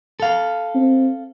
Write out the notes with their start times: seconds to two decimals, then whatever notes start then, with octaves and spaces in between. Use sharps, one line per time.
0.20 A4 F5
0.75 C4